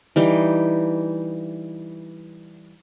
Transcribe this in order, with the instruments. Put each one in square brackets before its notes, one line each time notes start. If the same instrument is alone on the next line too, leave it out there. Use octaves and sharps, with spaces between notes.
[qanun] E3 G3 D#4